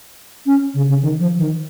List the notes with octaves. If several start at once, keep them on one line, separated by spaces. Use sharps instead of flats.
C#4
C#3
C#3
D#3
F3
D#3